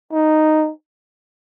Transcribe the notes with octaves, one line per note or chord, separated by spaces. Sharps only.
D#4